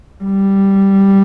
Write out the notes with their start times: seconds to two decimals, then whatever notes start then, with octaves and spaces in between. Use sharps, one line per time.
0.24 G3